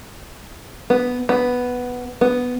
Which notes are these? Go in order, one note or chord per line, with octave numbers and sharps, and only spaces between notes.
B3
B3
B3